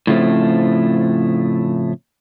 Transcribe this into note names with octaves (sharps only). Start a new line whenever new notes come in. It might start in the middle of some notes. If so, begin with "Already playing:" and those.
A2 C#3 F3 A3 C4